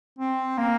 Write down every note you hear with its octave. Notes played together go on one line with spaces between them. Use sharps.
C4
A#3